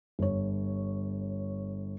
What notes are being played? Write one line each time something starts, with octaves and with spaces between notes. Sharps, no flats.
G1 C#5